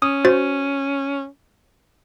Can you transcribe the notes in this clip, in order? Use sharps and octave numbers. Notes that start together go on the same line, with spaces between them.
C#4 D#6
F#4 C5 A6